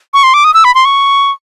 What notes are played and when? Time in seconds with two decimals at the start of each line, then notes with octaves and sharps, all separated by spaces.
0.14 C#6
0.23 C6
0.34 D6
0.44 D#6
0.54 E6
0.64 B5
0.75 C6
0.85 C#6